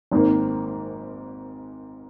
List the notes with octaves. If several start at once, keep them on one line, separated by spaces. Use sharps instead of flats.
G#1 G#2 D#3 A#3